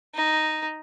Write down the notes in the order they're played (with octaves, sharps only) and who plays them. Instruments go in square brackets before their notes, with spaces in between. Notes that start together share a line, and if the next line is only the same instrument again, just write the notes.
[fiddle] D#4